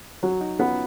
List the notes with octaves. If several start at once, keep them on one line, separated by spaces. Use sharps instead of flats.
F#3
D#4 F#4
B3 C#4 F4